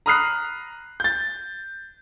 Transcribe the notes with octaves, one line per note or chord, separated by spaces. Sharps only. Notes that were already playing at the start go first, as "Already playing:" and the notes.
A#5 B5 D#6 F6 F#6 C7
G6 A6